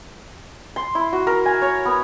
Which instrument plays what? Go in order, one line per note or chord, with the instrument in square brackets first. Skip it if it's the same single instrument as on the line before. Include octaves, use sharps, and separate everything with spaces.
[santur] C6
E4
F#4
A#4
G#5
C#5
B3